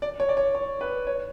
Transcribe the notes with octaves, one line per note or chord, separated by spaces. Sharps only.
D5
C#5
D5
C#5
C#5
B4
C#5